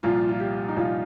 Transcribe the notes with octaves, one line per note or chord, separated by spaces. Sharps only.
C2 A#2 F3 F4
F4
G4
D#4
C2 A#2 F3 F4